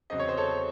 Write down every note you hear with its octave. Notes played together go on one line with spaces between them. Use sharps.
E2 C#3 F#3 C4 D#5
C#5
C5
A4 C#5